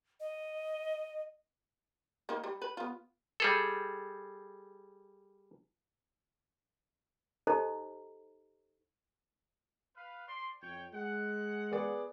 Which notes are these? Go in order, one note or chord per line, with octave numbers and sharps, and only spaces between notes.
D#5
A#3 D#4
G3
B4
B3 F4
G3 G#4 A4
D#4 G4 A4 C5 D#5 A#5
B4 F5
C5 D5 C6
F2 C#5 G5
G#3 F#5
B3 G#4 D5